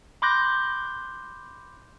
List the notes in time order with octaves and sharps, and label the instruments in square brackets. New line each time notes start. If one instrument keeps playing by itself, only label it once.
[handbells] B5 C6 D6 F#6 G6 A#6